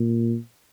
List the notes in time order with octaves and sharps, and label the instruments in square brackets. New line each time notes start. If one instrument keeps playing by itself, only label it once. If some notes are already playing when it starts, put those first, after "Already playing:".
Already playing: [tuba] A#2